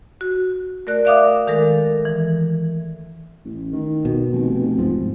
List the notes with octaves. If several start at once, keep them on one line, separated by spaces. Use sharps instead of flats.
F#4
A3 A#4 D5 F#6
D5 E5 F5 D6 D#6
D#3 G#3 A4 A#4
E3
A1
D#3
B2
F1
G#2 F3